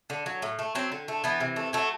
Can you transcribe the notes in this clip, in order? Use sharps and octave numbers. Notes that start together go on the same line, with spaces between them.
D3
F#3
A2
A3
F#3 C4
D3
A3
E3 B3
C3
A3
F#3 A3